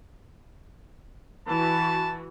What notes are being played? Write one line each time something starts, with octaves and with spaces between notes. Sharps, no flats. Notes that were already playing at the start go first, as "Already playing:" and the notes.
E3 F#4 A5